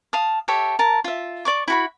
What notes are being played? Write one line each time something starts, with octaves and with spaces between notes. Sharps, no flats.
F5 A5 D#6
G4 A4 C#5 E5
A#4 A5
F4 E5
D5 C#6 D6
E4 F#4 B5